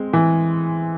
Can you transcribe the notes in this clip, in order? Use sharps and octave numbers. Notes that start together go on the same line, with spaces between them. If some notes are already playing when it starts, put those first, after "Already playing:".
Already playing: G#3 C4
E3